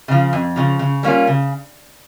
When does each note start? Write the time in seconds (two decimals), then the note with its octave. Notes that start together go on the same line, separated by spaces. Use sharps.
0.08 C#3 F3
0.33 F2
0.56 C#3 F3
0.79 C#3
1.03 G3 A#3 C#4 F4
1.27 C#3